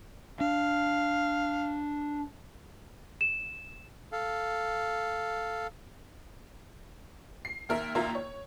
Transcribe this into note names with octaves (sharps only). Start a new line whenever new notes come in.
D4 F5
E7
A4 F5
C7
D#2 A#4 E5
A#1 D#2 A#3 F4 E5 A#5
C#5